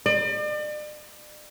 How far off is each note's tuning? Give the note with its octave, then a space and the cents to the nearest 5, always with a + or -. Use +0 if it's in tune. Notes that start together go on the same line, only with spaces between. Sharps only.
D5 +40